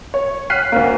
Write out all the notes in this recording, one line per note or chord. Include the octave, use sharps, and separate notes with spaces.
C#5
F6 F#6 B6 C7 D#7
D2 A#3